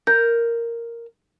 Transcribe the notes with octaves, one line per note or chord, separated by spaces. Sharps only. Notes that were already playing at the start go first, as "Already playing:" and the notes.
A#4 G6